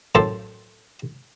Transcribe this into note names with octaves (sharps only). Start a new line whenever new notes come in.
F#2 A2 A4 C5 A5